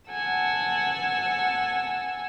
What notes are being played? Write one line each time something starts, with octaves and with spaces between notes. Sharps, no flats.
F#5 G#5 A5 E6